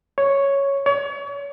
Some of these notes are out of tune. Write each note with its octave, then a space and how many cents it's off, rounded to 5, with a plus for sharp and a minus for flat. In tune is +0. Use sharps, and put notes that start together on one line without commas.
C#5 +0
C#5 +35